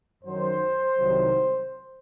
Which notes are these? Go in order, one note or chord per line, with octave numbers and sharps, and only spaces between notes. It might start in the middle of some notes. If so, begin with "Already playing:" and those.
F#2 D#3 F#3 C5
C2 C3 D#3 F#3